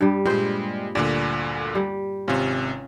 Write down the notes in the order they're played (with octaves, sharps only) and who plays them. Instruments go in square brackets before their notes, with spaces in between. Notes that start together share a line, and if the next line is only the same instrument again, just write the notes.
[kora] G2 G3
[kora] A#2 C5 [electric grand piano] G3 G#3
[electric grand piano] D2 A#2 D3 [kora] D5
[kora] G3
[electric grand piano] G#1 C3 [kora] C#4 F4